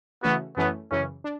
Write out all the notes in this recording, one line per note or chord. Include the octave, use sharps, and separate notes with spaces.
C#3 E3 A3 B3 C#4 F#4
F#2 E3 A3 B3 C#4
F#2 C#3 E3 C#4
D4